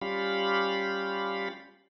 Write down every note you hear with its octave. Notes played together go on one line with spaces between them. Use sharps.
G3 C#4 F4 G4 F5 B5